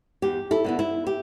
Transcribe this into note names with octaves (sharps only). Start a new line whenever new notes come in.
E2 G4
E4 A4
D3 B3 E4
E4
G4